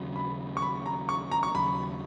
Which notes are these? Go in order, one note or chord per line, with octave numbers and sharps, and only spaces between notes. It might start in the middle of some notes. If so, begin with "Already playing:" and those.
Already playing: D#2 C#3 F#3
B5
C#6
B5
A#5
C#6
A#5
C#6
D#2 C#3 F#3 B5